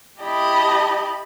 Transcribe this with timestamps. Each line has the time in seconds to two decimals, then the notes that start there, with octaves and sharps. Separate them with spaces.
0.21 E4 G4 D#5 A5 B5